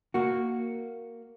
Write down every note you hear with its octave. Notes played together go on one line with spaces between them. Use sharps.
A#3 F#4